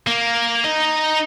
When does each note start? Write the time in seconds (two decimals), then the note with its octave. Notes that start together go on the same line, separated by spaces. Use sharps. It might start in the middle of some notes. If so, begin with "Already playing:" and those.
0.07 A#3
0.65 D#4 D#5